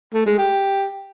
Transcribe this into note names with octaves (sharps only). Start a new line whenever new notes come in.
A3
G#3
G4